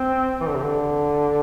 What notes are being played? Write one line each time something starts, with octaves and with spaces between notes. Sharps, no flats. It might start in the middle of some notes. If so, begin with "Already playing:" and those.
Already playing: C4
E3
D3
C3
D3